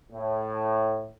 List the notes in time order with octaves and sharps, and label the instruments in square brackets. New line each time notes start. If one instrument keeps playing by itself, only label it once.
[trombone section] A2